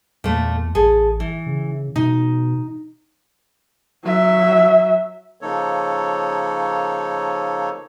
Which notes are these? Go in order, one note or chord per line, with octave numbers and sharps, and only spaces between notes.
E2 A#2 A3
A1 G#4 A4
E3
C#3
B2 D#4
F#3 E5
C#3 F3 A#3 D#4 A4 C#5